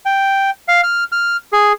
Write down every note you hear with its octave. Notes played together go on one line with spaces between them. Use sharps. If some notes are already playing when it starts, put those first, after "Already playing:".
G5
F5
F6
F6
G#4